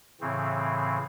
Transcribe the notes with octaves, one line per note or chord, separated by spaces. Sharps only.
A2 C#3 E3 C4